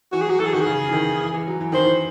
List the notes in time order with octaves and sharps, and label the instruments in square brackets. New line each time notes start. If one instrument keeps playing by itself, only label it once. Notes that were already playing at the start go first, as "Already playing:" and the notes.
[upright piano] E3 [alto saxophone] F#4
[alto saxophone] G#4
[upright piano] F#3
[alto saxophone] F#4
[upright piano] E3 [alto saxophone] A4
[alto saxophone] G#4
[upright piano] D#3 [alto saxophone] F#4
[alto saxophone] G#4
[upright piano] C#3
E3
D#3
E3
E3
F#3
E3
[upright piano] D#3 [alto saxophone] C5
[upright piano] E3